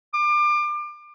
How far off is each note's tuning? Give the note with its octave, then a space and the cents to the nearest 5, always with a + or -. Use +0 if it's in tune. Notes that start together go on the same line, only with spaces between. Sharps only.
D6 +30